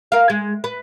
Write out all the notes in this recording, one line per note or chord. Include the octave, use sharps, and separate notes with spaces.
A#4 F5
G#3
B4